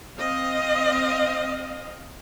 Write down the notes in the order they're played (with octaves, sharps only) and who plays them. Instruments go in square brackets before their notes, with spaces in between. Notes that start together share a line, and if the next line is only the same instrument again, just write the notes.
[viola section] C4 D#5 F5